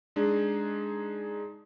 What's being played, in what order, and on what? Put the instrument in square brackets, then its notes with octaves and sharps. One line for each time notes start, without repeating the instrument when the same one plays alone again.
[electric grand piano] G#3 D4 D#4 G#4